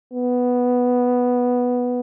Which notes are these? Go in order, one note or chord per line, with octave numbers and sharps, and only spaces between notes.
B3